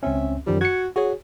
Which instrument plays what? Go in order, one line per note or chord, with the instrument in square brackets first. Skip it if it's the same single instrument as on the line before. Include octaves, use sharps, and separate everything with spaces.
[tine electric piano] C#2 C4 C#4 [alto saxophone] E5
[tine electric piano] F#2 D#3 F3 [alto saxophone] G3
[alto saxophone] F#4 [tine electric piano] G#6 C#7
[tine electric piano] F#4 C#5 [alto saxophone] G#4